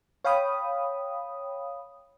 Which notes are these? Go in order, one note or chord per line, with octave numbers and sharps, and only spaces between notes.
C#5 F5 G5 B5 D#6